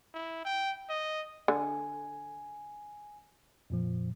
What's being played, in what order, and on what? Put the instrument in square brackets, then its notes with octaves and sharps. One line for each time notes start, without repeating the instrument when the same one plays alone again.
[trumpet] E4
G5
D#5
[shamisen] D3 [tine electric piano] G#5
[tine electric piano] F2 A#2 F3